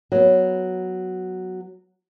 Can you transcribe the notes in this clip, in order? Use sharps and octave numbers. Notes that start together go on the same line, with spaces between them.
F#3 B3